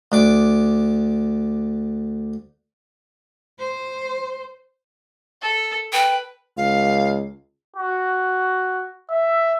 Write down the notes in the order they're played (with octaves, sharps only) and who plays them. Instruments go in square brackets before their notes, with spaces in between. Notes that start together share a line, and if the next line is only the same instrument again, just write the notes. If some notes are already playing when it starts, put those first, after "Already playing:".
[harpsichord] D2 D4 D6
[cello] C5
[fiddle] A4
[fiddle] B4 [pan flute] G5
[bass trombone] C#2 [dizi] F5
[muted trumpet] F#4
E5